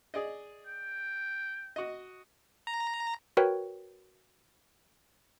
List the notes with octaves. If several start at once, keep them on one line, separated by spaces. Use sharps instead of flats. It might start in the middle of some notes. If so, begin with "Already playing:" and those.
G#4 D5 D#5
G5
F#4 D#5
A#5
F#4 A#4 B4 C#5 G5